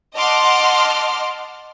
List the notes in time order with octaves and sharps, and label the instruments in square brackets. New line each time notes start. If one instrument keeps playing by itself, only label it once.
[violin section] D#5 F#5 A5 C6 D6 F6